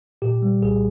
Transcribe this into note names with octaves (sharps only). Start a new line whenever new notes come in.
A#2 G4
G3
C2 G#4